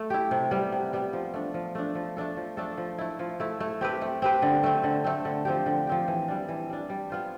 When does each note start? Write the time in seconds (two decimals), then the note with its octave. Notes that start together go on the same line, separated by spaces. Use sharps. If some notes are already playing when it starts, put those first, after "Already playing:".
Already playing: A3
0.10 E4 G4
0.31 C3
0.51 G3 B3
0.72 C3
0.93 G3 B3
1.13 F3
1.34 A3 D4
1.54 F3
1.75 A3 D4
1.95 F3
2.17 A3 D4 A4
2.37 F3
2.57 A3 D4 A4
2.77 F3
2.98 A3 E4
3.19 F3
3.40 A3 E4
3.60 A3
3.81 C4 G4 B4
4.02 A3
4.22 C4 G4 B4
4.42 D3
4.63 A3 C4
4.83 D3
5.04 A3 C4
5.25 D3
5.45 F3 C4 G4
5.66 D3
5.87 F3 C4 G4
6.08 E3
6.28 G3 D4
6.49 E3
6.69 G3 D4
6.90 G3
7.10 B3 F4 C5